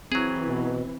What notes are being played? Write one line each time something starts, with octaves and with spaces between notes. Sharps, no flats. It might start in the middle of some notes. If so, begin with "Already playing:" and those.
E3 F#3 C4 G#4
B2